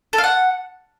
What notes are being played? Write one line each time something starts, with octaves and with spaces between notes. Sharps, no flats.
A4
F5
F#5